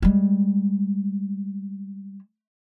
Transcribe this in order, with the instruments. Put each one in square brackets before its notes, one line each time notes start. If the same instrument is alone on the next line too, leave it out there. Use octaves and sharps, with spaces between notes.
[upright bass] G3 G#3